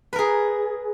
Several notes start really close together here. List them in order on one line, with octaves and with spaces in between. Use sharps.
B4 A#4 G#4